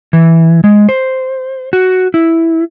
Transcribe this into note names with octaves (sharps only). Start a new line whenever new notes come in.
E3
G#3
C5
F#4
E4